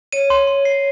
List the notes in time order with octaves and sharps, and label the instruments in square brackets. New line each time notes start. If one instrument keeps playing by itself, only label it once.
[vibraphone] C#5 [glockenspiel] D#7
[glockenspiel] C6
C6
C7